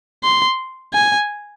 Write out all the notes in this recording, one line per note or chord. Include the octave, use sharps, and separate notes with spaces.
C6
G#5